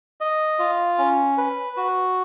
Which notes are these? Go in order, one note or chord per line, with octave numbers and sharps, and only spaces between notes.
D#5
F4
C#4
B4
F#4